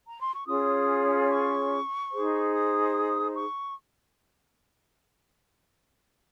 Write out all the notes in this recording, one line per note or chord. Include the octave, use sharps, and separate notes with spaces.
A#5
C6
C#6
C#4 F4 G#4 C#5 D#6
C#6
D#4 G#4 C5
D#6
C#6